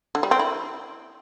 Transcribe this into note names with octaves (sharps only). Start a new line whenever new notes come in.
D3
G3
C4
E4